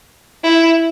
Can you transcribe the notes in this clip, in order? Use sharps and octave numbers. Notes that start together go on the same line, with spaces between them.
E4